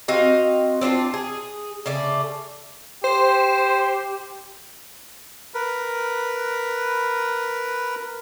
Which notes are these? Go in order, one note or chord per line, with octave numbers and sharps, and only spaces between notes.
C4 F#4 D#5 F5
C4 D4 E4 F4
G#4
C#3 A3 D5
G4 C5
A#4 B4